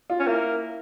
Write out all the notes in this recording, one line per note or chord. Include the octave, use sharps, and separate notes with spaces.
F4
C#4
A#3 E4